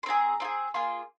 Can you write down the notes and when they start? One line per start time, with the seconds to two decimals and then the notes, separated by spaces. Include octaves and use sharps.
0.03 C6
0.06 C4 F4 G#4 A#5
0.40 C4 F4
0.45 G#4
0.74 A#3 F4 G#4 C6